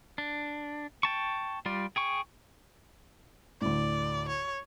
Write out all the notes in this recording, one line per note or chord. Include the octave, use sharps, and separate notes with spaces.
D4
G5 A5 C#6
G3 F4 D5
G#4 G5 C#6
D2 A2 D5
C#5